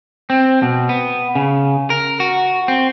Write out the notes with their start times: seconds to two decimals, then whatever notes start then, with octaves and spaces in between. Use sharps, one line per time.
0.30 C4
0.62 B2
0.89 B3
1.35 C#3
1.90 A#4
2.20 F#4
2.68 C4